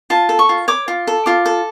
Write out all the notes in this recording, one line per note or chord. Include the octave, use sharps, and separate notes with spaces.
F4 A5
A4
C#6
F4
C#5 D6
F4
A4
F4 D6
A4